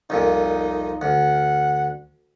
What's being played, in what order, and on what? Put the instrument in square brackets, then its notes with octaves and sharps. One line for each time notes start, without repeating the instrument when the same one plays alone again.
[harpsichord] C2 F2 A#2 [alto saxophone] D#4
[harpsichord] D2 [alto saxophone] F#5